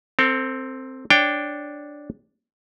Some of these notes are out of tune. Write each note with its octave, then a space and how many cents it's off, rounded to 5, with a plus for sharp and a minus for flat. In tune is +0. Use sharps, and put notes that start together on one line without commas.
C4 +0 A4 +35
D4 +0 C#5 +0 G5 +0